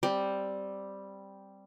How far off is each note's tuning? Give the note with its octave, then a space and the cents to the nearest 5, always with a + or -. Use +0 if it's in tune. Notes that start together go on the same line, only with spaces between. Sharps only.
G3 +0 C4 +0